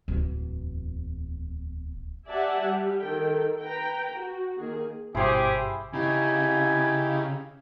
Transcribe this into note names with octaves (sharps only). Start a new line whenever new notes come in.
D1 E2
G4 D5 E5 F#5 G#5 A5
G3
D#3 A4 G5
B4 G5 A#5
F#4
D#3 A#3 G#4
G#1 G2 B2 E4 G4 G#4 C5
C#3 D#4 E4 G4 G#5